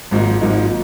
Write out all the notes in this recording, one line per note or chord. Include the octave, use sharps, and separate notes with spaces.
G#1 G#2 F3 A#3 D#4
G#1 G#2 F3 A#3 D#4